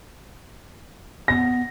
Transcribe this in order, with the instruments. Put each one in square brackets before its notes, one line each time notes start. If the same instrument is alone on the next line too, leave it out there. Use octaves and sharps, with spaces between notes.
[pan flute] B3 [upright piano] A#6